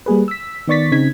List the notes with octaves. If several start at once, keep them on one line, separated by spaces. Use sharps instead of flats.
G3 A#3 G#4 B4
E6 B6
D#3 B3 D5 C#6 A6 B6
C#3 C4 D#4 G#6 B6